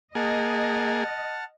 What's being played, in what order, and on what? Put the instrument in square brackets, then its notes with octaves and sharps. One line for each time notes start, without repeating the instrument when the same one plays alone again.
[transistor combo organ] A#3 G#4 [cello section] D#5 [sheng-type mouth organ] F#5 A5 F6